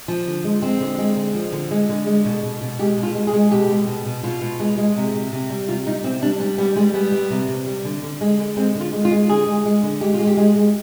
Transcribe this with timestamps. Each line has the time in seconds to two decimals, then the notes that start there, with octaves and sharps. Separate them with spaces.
0.08 F3
0.27 D3
0.44 G#3
0.62 G#3 C4
0.81 D3
0.98 G#3
1.17 D3
1.34 F3
1.52 D3
1.71 G#3
1.89 D3
2.07 G#3
2.25 B2
2.43 B2
2.61 B2
2.79 G#3 G4
2.97 B2
3.03 F4
3.15 G#3
3.27 G#4
3.33 G#3
3.51 B2 G4
3.70 G#3
3.87 B2
4.05 B2
4.23 B2 F4
4.42 B2
4.60 G#3
4.78 G#3
4.96 C3
5.14 C3
5.32 C3
5.50 G3
5.68 C3 F4
5.86 G3 D#4
6.04 C3 C4
6.22 G3 D4
6.40 G3 D4
6.58 G3 B3
6.76 G3 G#3
6.94 G3 B3
7.12 G3
7.30 C3
7.49 C3
7.66 G3
7.85 D3
8.03 D3
8.21 G#3
8.39 D3
8.57 G#3 C4
8.75 D3
8.81 F4
8.93 G#3
9.05 F4
9.11 G#3
9.29 D3 G#4
9.47 G#3
9.65 G#3
9.83 D3
10.01 G#3 G4
10.14 F4
10.19 G#3
10.27 G4
10.37 G#3
10.56 G#3